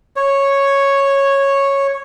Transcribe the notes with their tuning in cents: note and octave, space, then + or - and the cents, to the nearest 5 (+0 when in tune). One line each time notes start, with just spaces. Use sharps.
C#5 -5